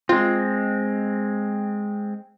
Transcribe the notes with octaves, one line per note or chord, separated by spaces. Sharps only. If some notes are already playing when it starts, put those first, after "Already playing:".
G#3 C4 F4